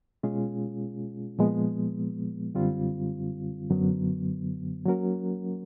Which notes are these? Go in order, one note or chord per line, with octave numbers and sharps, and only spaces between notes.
B2 G#3 C#4 F4 G#4
A#2 F3 G#3 B3
F#2 D3 G3 C4 F4
F#2 D3 F#3 B3
F#3 A#3 C#4 F#4 A#4